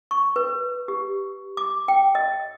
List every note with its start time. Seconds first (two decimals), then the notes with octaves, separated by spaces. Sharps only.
0.11 C#6
0.36 B4
0.88 G4
1.57 D6
1.88 G5
2.15 D#5